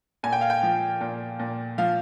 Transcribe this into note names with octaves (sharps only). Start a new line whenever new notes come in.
A#2 G#5
G5
F5
G5
F3
A#2
A#2
F3 F5